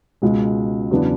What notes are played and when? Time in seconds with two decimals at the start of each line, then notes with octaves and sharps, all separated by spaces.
0.22 C#2 B2 G#3
0.91 E2 C#3 F#3 B3 D4